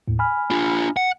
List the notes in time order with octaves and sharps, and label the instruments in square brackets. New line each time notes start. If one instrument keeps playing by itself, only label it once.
[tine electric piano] D#2 A2
G#5 B5 F6
[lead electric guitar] D4 F4
F#5